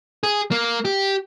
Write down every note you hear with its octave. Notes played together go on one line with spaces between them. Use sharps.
G#4
A#3
G4